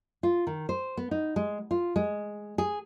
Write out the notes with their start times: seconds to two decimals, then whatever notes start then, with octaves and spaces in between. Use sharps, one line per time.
0.23 F4
0.47 D#3
0.69 C5
0.97 B3
1.11 D#4
1.36 G#3
1.71 F4
1.96 G#3
2.58 G#4